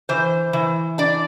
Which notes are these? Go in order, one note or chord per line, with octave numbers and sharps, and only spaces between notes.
E3 C5
E3
D4 D5